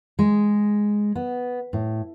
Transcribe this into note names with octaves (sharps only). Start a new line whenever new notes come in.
G#3
B3
A2